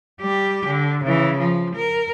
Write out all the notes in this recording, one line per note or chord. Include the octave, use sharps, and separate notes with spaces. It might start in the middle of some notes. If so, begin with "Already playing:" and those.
G3 G4
D3
C#3 E3
F3
A#4